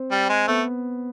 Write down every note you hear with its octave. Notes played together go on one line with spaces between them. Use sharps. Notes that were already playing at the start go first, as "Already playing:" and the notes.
Already playing: C4
G3
G#3
A3 B3